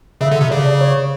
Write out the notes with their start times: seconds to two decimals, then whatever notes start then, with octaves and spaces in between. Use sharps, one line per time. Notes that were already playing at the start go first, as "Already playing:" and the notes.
0.21 C#3 E5
0.31 D3
0.41 C3
0.51 C#3 D5
0.66 D5
0.81 C#5